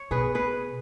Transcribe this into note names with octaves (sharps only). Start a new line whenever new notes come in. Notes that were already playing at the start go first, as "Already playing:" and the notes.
Already playing: C#5
B2 G#4 B4
G#4 B4